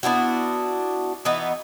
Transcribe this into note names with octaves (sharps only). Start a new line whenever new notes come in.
B3 D4 E4 F#4
E3 B3 D#4